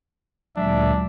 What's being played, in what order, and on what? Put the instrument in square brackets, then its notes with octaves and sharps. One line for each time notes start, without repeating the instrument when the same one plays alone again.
[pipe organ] D2 A#2 E5 [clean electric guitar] F#3 G#3 D5 [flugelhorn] D4